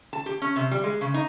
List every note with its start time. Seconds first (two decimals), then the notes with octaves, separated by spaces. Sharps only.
0.13 A5
0.26 G4
0.42 C#4
0.56 C3
0.71 G3
0.84 G#3
1.01 C#3
1.14 D#4